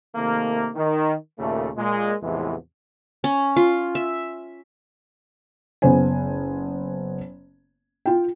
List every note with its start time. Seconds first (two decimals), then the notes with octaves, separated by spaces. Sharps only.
0.16 C3 D#3 A3 A#3
0.76 D#3
1.39 D#2 A#2 C#3 A3
1.76 A#2 G#3
2.23 E2 A2 C3 E3 F3 G#3
3.24 C#4
3.56 F4
3.95 E5
5.82 F#1 B3 C5 G#5
8.06 F4 G5